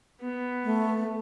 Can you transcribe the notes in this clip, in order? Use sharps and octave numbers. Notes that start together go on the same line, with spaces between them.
B3
A3